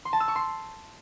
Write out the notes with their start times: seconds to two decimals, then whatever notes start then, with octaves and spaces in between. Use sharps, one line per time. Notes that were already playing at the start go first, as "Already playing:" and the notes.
0.05 C6
0.13 A5
0.20 E6
0.28 C#6
0.35 C6